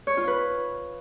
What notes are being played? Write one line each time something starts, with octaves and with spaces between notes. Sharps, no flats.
C#5
F4
B4